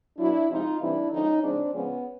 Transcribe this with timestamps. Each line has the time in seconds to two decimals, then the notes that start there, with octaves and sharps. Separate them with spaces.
0.18 B2 F#3 D4 E4
0.49 C3 F3 G#3 D#4 F4
0.80 C3 E3 G3 D4 E4
1.12 D3 F3 G#3 C#4 D#4
1.42 C#3 F3 G#3 C4 D4
1.73 C#3 F3 G#3 B3 C#4